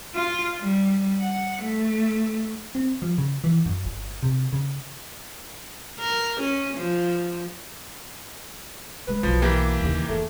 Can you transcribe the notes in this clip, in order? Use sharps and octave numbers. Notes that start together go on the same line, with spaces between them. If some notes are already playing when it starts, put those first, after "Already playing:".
F4
G3
F#5
A3
C4
F3
C#3
E3
F#2
G1
C3
C#3
A#4
C#4
F3
D3 G#3 B4
B1 F3 F#3
E3 A#3 G4
D#2 C#3
E2 D3 A3